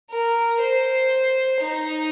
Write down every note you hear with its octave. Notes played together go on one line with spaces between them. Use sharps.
A#4
C5
D#4